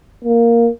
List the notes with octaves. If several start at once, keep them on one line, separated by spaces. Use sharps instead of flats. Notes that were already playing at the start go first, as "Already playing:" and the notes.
A#3